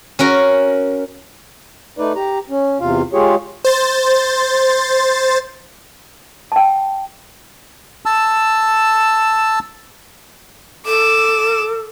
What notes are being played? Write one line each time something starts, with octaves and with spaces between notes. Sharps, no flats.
C#4 F#4 A#4
A3 D#4 B4 D5
G4 A#5
C#4
E2 C3 F4 F5
G#3 F4 G4 G#4 C#5
C5 A6
G5 A5
A5 E6
A4 D6 E7